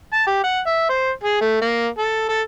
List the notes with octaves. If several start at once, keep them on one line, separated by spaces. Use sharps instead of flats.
A5
G4
F#5
E5
C5
G#4
A3
A#3
A4
A4